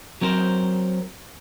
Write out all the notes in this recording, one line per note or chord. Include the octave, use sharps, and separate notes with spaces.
F#3 C4 A#4 C5